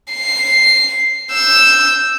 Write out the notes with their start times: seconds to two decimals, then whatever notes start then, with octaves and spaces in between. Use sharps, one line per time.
0.13 C7
1.32 E6 G6